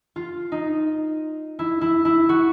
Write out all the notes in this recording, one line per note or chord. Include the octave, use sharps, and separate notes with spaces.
F4
D#4
E4
E4
E4
F#4